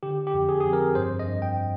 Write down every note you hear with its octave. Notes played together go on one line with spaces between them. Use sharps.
D3 G4
G4
F2
G#4
F2 G#4
A#4
G2 C5
D#5
G2
G5